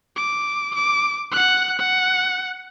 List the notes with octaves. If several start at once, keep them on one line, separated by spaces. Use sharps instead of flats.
D6
D6
F#5 F#6
F#5